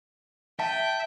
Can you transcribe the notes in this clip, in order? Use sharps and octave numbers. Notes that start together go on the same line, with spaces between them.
E5 G5 A5